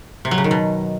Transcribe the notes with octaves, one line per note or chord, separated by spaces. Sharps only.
C3
F#3
C#3
D#3
B2